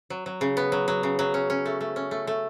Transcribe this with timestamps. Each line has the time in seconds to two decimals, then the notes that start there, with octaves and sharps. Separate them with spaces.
0.10 F#3
0.26 F#3
0.41 C#3
0.57 B3
0.72 F#3
0.88 F#3
1.03 C#3
1.19 F#3
1.34 C#4
1.50 C#4
1.66 A3
1.81 A3
1.96 C#4
2.11 A3
2.27 A3